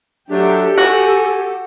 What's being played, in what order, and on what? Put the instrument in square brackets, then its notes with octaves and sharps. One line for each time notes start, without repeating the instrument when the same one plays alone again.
[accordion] F#3 A3 D4 [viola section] G4 A4
[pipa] F#4 [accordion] G#5